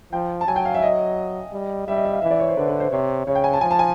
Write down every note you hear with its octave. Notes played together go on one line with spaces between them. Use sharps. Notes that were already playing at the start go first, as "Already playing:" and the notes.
F3 G5
A5
F#3 G#5
G5
F5
E5
D#5
G3
G3 E5
D#5
E5
F5
E3 E5
D5
C#5
C5
D3 B4
B4
C5
C3 C#5
C#3 C#5
G5
G#5
A5
F3 G#5
A5
G#5